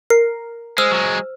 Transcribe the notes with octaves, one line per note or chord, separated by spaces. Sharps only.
A#4 C7
G#3 C5 E6 F6
F#3 G#3